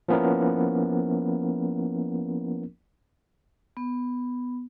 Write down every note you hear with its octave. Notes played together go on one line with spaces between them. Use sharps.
F3 A#3 B3 C#4 E4 A#4
B3